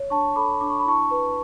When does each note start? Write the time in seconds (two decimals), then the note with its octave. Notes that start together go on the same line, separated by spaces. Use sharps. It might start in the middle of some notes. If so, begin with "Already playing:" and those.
Already playing: C#5
0.10 D4 A5 C#6
0.36 A4 B5 D6
0.61 D4 D6
0.69 C#6
0.79 B5
0.85 E4 A5 C#6
1.11 B4